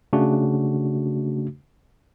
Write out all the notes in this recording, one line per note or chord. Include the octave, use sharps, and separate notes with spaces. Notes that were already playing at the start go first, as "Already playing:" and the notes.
C#3 A3 D4 F#4